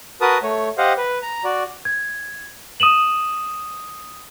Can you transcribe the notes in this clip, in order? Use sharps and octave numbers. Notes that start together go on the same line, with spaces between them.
F#4 A#4 B4 A5 D#6
A3 C#5
G4 C5 D#5 F5 F#5
B4
A#5
F#4 D5
G#6
D#6 D#7 E7 F#7